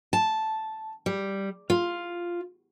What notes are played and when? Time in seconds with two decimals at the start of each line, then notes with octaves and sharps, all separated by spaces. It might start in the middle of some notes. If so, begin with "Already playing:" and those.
0.13 A5
1.06 G3
1.70 F4